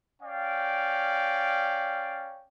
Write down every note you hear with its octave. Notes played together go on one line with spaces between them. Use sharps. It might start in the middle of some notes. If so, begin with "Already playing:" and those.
C#4 D5 F5 G5